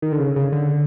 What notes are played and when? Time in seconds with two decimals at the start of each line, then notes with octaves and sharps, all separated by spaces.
0.02 D#3
0.12 D3
0.19 C#3
0.36 C#3
0.52 D3